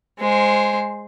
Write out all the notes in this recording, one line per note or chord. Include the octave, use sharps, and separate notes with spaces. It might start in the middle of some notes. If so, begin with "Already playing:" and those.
G#3 C5